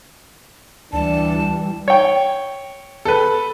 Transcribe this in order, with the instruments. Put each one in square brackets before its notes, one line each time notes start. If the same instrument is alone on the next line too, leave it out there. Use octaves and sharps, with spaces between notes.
[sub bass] D2 [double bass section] E3 G3 [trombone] D4 [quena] A5
[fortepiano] C#5 G5
[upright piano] A4 B4